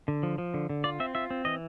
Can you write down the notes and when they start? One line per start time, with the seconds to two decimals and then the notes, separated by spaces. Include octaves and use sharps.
0.08 D3
0.23 F3
0.38 F3
0.54 D3
0.69 D3
0.84 F4 D5
1.00 C4 E5
1.15 F4 E5
1.30 C4
1.45 E3 D#5